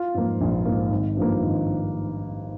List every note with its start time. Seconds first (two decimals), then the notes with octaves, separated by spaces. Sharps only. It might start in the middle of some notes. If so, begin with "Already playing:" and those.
Already playing: F4
0.14 G#2 F3 A#3
0.41 A#1
0.65 G#2 F3 A#3
0.91 G#1
1.17 G2 F3 A#3
1.42 G#1